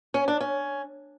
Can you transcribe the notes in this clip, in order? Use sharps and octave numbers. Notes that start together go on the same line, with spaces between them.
C#4
D4
C#4